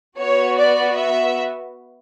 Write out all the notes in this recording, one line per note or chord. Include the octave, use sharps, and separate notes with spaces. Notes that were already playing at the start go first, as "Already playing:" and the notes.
B3 F#4 C#5
D5
E5